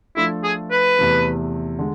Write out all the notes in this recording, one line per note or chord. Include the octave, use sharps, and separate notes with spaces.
F3 A3 D4 E4 F4 A4
G#4
B4
E2 C3 E3 A3
D3 G#3